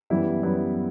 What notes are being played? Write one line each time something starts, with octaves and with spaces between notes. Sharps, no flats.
F#2 E3 G3 B3 E4
F#2 E3 G3 B3 E4